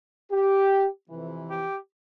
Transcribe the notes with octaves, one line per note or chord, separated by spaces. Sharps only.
G4
F2 C3 E3
G4